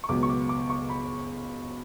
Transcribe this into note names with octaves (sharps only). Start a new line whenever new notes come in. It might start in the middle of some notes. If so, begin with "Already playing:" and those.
C#6
C#2 B2 F#3 B3 D6
C#6
D6
D6
C#6
B5